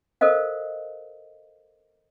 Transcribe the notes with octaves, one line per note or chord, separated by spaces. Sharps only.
A4 A#4 C5 D#5 F5